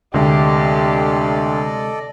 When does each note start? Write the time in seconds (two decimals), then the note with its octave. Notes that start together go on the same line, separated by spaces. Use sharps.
0.14 D2 C3 G#3 G4 A4 D5 D#5